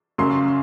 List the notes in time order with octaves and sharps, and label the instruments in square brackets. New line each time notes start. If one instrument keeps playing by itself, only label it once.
[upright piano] F#2 C#3 F#3 C6